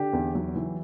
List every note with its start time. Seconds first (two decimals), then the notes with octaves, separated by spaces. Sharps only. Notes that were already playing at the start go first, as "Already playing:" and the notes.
Already playing: D3 G4
0.13 E2
0.35 F#3
0.56 E3